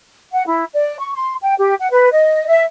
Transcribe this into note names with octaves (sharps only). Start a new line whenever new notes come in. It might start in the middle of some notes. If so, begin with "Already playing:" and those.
F#5
E4
D5
C#6
C6
G5
G4
F#5
B4
D#5
E5